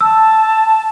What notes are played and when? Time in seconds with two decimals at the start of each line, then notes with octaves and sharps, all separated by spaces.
0.01 A5 E6